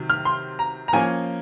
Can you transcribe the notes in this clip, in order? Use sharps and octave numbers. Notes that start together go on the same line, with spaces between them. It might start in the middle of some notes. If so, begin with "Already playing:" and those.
Already playing: C3 D#3 F#3
F6
C6
A#5
A#5
F3 A#3 C#4 G#5